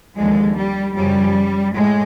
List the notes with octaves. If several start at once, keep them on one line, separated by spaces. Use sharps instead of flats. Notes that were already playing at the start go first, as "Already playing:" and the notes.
D#2 D3 F3 G#3
G3
F#2 C#3 F3 G3
A2 G#3